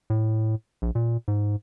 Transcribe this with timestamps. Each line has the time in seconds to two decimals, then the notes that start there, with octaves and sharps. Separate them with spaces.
0.10 A2
0.82 A#1
0.95 A#2
1.28 G#2